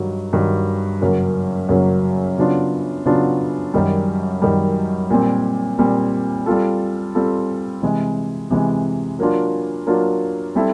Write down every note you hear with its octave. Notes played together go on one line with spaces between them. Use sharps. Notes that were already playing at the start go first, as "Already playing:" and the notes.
Already playing: G2 D#3 F#3
G2 D#3 F#3
F#2 C#3 F#3 A#3
F#2 C#3 F#3 A#3
C#3 F#3 B3 D4 F4
C#3 F#3 B3 D4 F4
F#2 D#3 G3
F#2 D#3 G3
A#2 G3 C4
A#2 G3 C4
G3 C4 F4 A4
G3 C4 F4 A4
C3 E3 G#3
C3 E3 G#3
F#3 A#3 D4 F4
F#3 A#3 D4 F4
G3 C4 E4 A4